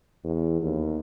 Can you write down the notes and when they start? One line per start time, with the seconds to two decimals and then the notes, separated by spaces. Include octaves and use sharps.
0.24 E2
0.62 D#2